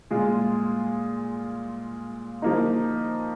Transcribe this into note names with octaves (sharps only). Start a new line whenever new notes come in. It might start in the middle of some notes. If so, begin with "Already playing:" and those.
A#2 G#3 F4 G#4
F3 A#3 D#4